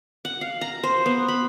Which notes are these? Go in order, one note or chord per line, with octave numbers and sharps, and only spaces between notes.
F#5
F5
A#5
C5
B3
B5